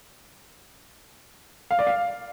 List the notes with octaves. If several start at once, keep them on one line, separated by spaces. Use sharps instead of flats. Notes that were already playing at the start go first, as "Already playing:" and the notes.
F5
D5
F5